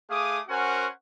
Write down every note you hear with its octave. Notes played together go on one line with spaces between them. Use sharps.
A3 G#4 F5 D6 D#6
C#4 F#4 A#4 C5 F#5 G#5